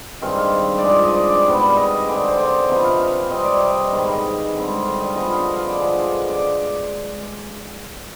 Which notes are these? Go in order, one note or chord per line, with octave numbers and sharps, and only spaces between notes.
G2 D#3 G#3 C4 F5
F5
D5
G2 F3 G#3 D#5
D#5
D5
D5
G#2 G3 B3
F5
D#5
D3 G#3 C4 D5
C5
D5
C3 F3 B3 D#5
F5
F5
C3 G3 C4 D#5
D5
D#5
G#2 D#3 G#3 B3 D#5
F5
D#5
D3 G3 C4
F5
D#5
D3 F3 G#3 B3 D#5
F5
D#5
F5
D5
D3 F3 G#3
D5